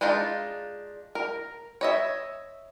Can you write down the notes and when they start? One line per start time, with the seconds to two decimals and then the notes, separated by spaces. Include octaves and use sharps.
0.01 G#3 D4 D#4 F4
1.15 A#4
1.81 C#5 D#5 E5